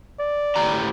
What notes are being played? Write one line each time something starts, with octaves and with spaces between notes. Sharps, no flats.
D5
A2 G4 A#5